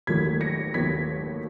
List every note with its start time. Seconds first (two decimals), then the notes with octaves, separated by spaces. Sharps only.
0.07 F1 D#2 D#3 F#3 A#3 G#6 B6
0.41 A#6 C#7
0.74 F1 D#2 D#3 F#3 A#3 G#6 B6